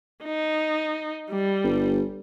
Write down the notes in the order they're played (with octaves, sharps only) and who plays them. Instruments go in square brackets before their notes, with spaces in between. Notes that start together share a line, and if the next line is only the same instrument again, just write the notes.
[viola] D#4
G3
[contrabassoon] G1